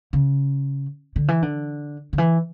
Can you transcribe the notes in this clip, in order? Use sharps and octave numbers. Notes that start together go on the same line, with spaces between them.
C#3
D3
E3
D3
D3
E3